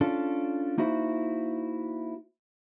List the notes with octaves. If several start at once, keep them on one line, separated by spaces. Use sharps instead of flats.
C#4 D4 F4 A4
A#3 D#4 E4 F#4 C5